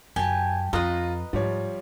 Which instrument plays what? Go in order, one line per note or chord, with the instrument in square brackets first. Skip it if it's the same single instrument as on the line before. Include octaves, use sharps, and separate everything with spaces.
[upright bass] F#2 [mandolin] G4 A5 [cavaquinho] G#5
[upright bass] F2 [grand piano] F4 [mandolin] B4 D#5 A#5 [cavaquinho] C6 D#6
[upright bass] G#2 [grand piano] F3 G3 C#5